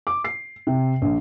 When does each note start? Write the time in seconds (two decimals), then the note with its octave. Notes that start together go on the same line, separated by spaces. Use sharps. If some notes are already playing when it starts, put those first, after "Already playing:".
0.07 D6
0.24 C7
0.67 C3
1.02 A#1